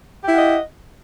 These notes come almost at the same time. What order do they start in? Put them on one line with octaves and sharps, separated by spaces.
G4 E4 F#5 D#5